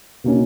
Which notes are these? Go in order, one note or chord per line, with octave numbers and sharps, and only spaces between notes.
B2 A#3 C#4